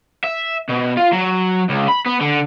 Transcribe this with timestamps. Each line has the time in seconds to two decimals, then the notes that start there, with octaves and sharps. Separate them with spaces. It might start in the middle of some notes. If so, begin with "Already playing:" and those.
0.24 E5
0.69 B2
0.97 F4
1.13 F#3
1.70 C#2
1.89 B5
2.06 B3
2.21 D3